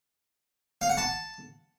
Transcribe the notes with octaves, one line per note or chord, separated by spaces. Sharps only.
F5
F#5
A5